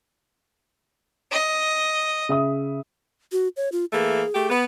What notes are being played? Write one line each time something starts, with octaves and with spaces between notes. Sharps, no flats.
D#5
C#3 E5 D#6
F#4
C#5
F4
E3 A3 A#3 G#4
A3 G4
B3